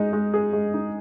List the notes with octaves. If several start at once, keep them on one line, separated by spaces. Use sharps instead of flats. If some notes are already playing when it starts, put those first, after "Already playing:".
Already playing: G#3 D#4
G#3
G#4
G#3
D#4